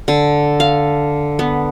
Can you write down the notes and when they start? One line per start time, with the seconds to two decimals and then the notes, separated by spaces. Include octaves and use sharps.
0.08 D3
0.60 F5
1.39 B3